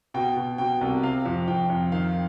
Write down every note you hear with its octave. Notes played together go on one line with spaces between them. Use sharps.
B2 G5
B2
B2 G5
C2
C3 F5
F2
F2 G5
F2
D#3 F5